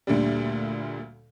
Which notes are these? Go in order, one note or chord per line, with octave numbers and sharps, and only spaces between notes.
D2 A#2 D3 G3